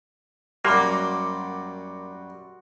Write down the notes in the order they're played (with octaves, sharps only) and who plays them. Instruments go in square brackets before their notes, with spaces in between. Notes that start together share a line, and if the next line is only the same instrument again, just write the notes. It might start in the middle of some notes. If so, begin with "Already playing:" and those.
[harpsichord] F#2 G3 [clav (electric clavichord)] A#3 [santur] F#4 C6 D6